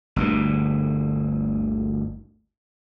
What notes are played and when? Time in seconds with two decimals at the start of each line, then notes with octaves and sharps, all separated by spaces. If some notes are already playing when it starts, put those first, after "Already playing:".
0.16 G1 D2 A#2